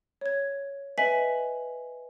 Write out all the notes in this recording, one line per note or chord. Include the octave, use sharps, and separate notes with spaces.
C#5 G#6
B4 D#5 E5 G#5 B6 F#7